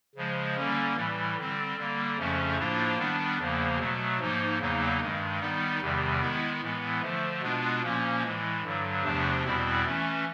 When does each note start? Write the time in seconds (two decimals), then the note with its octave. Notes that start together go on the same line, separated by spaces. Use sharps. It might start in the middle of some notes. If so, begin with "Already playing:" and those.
0.16 C#3 F3 G#3
0.55 D3 G3 A#3 C#4
0.95 A2 E3 G3
1.36 D3 G3 C4
1.77 D3 G3 A#3
2.18 F2 C#3 F3 A3 C#4
2.57 A2 F3 A#3 D4 F4
2.98 D#3 G3 B3 D4
3.38 E2 C#3 F3 A#3
3.78 B2 F#3 A3
4.19 G#2 F3 A#3 D#4
4.59 E2 C#3 F#3 A#3 D#4
5.00 G2 D#3 G#3
5.40 D#3 G3 B3 D#4
5.81 E2 C3 D#3 G3
6.21 D#3 G#3 B3 E4
6.61 A2 E3 G#3 B3
7.02 D3 F3 A3
7.42 B2 G#3 B3 D4 F4
7.83 A#2 F3 A#3 C#4
8.22 A2 E3 G#3
8.63 G2 D3 F#3
9.04 E2 C3 F3 A3 D4
9.45 E2 B2 G3 C4 E4
9.85 E3 A3 C#4